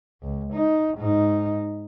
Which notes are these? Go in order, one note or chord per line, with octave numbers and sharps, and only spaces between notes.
C#2
D#4
G#2 D#4